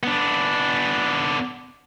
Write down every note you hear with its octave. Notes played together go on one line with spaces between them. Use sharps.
B3 D4